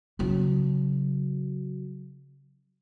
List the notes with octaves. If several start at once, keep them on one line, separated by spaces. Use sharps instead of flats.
C#3 F#3